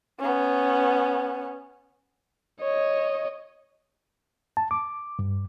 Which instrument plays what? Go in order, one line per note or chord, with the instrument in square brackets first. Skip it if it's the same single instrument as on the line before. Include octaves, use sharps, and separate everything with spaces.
[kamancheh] B3 C#4
[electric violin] C#5 D#5
[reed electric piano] A5
D6
G2